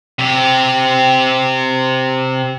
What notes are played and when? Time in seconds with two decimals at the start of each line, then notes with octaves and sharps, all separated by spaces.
0.19 C3 G4